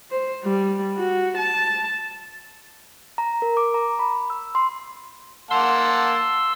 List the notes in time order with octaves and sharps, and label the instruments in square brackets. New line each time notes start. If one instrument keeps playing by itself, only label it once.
[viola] C5
G3
F#4
A5
[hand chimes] A#5
A#4
D6
A#5
B5
E6
C6
[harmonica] A#3 F#5 A5 [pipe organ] C6 E6